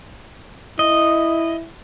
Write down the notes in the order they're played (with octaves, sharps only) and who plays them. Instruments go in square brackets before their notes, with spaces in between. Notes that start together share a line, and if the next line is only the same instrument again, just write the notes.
[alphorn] E4 [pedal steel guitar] D#5